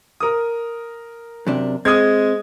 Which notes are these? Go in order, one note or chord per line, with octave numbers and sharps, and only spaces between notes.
A#4 D#6
F#2 C3 D4
G#3 C4 D#6 G#6